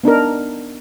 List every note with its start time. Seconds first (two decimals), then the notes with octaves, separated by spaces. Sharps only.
0.04 B3 D4 D#4 A#4